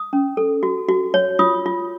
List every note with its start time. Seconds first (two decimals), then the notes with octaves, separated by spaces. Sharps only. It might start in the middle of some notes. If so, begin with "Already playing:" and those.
Already playing: D#6
0.13 C#4
0.37 A4
0.63 F#4
0.89 F#4
1.14 C#5
1.39 F4 D#6
1.66 F4